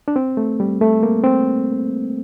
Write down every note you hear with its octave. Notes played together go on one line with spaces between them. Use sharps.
D4
C4
A3
G3
A3
A#3
C4